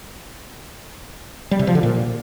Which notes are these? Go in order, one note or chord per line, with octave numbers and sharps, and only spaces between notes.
G3
C3
F3
D3
A#2